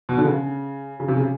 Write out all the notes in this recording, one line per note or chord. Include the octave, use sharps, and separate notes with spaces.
B2
D3
C#3
C#3
C3
C#3